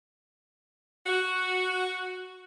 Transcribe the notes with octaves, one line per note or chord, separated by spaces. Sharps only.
F#4